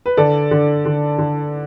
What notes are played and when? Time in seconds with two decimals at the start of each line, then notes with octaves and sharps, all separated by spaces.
0.06 B4
0.17 D3 A4 D5
0.51 D3
0.85 D3
1.18 D3